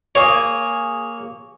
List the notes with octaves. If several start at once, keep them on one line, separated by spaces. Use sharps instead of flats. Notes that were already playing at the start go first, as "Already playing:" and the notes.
A#3 G#4 C#5